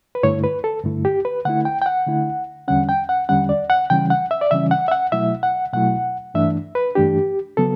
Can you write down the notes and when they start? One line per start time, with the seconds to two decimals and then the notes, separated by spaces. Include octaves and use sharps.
0.15 B4
0.23 G2 D3 A3 E4 C#5
0.44 B4
0.64 A4
0.84 G2 D3 A3 E4
1.05 G4
1.25 B4
1.45 D3 A3 E4 F#5
1.65 G5
1.82 G5
1.86 F#5
2.07 D3 A3 E4
2.68 E2 D3 G3 C#4 F#5
2.89 G5
3.09 F#5
3.29 E2 D3 G3 C#4 F#5
3.49 D5
3.70 F#5
3.90 C#3 E3 G3 C#4 G5
4.10 F#5
4.31 E5
4.41 D5
4.51 C#3 E3 G3 C#4 E5
4.71 F#5
4.88 E5
4.92 F#5
5.12 B2 F#3 A3 E4 E5
5.43 F#5
5.73 B2 F#3 A3 E4 F#5
6.34 G2 E3 A3 D4 E5
6.75 B4
6.95 G2 E3 A3 D4 G4
7.57 C#3 F#3 B3 A4